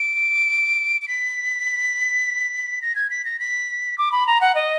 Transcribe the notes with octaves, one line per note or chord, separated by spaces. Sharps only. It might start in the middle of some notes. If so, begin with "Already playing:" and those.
Already playing: D7
D7
B6
A#6
G#6
B6
A#6
B6
D6
B5
A#5
F#5
D#5